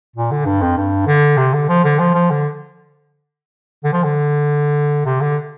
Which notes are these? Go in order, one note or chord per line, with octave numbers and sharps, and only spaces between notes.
A#2
D3
G2
F2
G2
D3
C3
D3
F3
D3
F3
F3
D3
D3
F3
D3
C3
D3